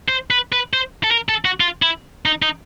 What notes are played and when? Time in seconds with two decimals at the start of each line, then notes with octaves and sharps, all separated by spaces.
0.09 C5
0.30 B4
0.52 B4
0.73 C5
1.04 A4
1.11 A#4
1.29 A4
1.45 F#4
1.60 F4
1.82 E4
2.25 D#4
2.42 D#4